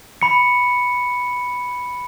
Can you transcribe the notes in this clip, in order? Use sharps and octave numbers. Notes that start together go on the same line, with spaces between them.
B5 C#7